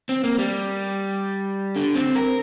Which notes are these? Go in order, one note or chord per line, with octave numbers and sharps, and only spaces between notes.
C4
A#3
G3
D3
C4
A#4